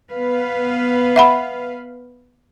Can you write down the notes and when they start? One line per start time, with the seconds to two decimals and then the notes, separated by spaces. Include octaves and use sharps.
0.11 B3 B4 F5
1.16 E5 F#5 B5